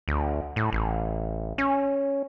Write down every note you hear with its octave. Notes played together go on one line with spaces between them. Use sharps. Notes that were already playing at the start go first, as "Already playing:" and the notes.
D2
A2
A1
C#4